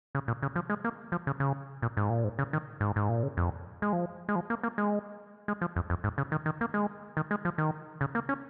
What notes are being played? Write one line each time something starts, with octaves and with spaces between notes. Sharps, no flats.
C#3
A#2
C#3
F3
G#3
A#3
F3
C#3
C#3
A#2
G#2
A#2
G#2
C#3
D#3
G#2
G#2
A#2
C#3
F2
G#3
F3
G#3
F3
A#3
A#3
G#3
G#3
F3
F2
F2
G#2
C#3
D#3
D#3
A#3
G#3
D#3
G#3
F3
D#3
C#3
A#3
C#4